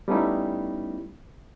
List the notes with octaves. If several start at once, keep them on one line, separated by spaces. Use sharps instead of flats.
G3 A3 B3 C#4 D#4 E4